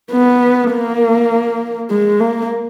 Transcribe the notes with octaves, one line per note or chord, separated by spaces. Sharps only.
B3
A#3
G#3
A#3